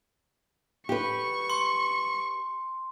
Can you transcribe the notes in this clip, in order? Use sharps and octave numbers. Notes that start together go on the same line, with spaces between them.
G4 B4 C#6
C6